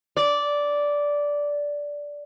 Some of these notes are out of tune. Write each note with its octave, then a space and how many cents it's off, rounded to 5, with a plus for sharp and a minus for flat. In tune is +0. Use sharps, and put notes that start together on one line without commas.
D5 -10